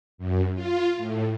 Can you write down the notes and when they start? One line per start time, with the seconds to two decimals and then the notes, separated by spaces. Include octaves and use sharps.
0.18 F#2
0.54 F4
0.97 A2